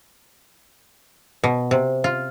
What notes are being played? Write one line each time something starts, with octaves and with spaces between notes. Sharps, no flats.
B2
C3
F4